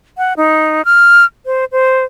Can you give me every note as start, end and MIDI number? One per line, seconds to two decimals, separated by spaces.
0.18 0.33 78
0.37 0.84 63
0.85 1.25 89
1.46 1.65 72
1.72 2.04 72